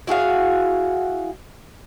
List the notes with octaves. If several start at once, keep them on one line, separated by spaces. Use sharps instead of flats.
E4 F#4 G#4 F5